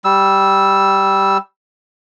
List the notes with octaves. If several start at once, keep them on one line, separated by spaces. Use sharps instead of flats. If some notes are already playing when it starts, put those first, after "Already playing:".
G3 E6